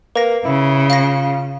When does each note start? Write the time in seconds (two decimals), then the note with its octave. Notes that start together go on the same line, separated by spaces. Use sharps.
0.15 A#3 B4 A#6
0.45 C#3 E4
0.90 F4 F5 A#6